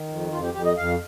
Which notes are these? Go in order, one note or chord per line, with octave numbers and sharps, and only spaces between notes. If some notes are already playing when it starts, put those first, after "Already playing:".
Already playing: D#3
F2
F2 F4
G4
F2 G4
D#5
F2 F5